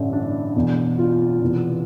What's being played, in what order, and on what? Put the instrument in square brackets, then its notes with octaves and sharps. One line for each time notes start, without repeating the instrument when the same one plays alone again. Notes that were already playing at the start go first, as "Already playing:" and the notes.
Already playing: [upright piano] A1 G2 D3 [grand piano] E4
[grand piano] D4
[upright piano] E1 E2 B2
[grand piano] F4
[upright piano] E1 E2 C3 E3 B3